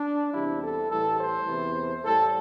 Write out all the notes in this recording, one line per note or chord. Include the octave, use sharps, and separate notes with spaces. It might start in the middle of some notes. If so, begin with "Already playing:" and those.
Already playing: D4
E2 C3 E3 G3 E4
A4
A2 E3 G3 A4
C5
E2 C3 E3
A2 G3 A4